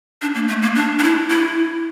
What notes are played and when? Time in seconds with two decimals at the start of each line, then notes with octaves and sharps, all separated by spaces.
0.22 D4
0.35 A#3
0.48 A3
0.62 A#3
0.75 D4
0.99 D4
1.03 E4
1.30 E4